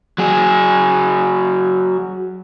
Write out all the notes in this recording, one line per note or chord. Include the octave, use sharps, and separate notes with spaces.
F#3 G#4